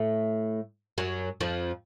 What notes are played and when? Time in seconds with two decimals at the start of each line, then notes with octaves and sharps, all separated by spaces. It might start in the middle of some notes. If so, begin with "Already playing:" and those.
Already playing: A2 A3
0.98 F#2 F#3
1.41 F2 F3